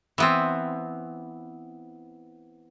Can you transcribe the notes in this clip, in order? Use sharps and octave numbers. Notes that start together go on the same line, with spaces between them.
E3 B3 C4